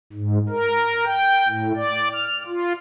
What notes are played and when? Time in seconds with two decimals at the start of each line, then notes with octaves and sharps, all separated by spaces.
0.13 G#2
0.49 A#4
1.05 G5
1.48 A2
1.76 D5
2.13 F6
2.47 F4